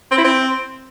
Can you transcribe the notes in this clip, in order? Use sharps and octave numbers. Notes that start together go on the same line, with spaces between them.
C4
E4
C4